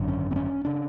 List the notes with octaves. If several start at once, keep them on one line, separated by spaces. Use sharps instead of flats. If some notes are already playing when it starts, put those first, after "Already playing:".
Already playing: G#1 F#2 D3
C#4
C4
C#4
C#3 D4